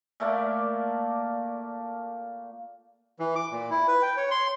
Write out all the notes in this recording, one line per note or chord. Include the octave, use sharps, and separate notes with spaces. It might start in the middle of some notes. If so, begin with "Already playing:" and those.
A#2 A3 A#3 D5
E3
D6
A#2
E4
B4
G5
C#5
C6